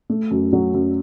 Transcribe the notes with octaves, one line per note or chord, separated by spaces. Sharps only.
A3
F#2
F#3
F#2